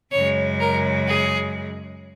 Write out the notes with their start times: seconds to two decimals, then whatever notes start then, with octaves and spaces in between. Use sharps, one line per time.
0.11 F#2 C#3 G#3 C#5
0.60 A#4
1.07 G#4